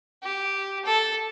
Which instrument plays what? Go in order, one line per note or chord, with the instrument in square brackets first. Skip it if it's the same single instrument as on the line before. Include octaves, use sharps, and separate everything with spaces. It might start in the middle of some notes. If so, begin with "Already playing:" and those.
[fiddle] G4
A4